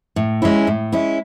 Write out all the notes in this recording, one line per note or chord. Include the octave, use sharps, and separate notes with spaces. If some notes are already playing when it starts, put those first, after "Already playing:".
A2
G#3 C#4 E4
A2
G#3 C#4 E4